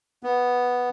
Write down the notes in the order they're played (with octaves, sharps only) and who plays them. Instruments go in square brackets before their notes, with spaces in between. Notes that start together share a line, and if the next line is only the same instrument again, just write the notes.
[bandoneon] B3